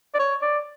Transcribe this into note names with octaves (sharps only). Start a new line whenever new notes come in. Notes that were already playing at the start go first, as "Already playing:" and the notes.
D5
C#5
D5